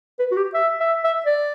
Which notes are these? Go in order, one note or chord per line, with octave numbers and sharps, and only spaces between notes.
B4
F#4
G4
E5
E5
E5
D5